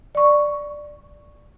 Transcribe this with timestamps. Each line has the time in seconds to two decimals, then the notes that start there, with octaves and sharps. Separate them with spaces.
0.15 D5 C#6